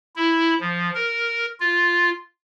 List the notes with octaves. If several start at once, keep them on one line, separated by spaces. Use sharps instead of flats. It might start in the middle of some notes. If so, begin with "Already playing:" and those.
E4
F3
A#4
F4